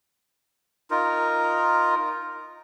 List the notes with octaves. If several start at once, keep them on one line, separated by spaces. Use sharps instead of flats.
D#4 F4 A#4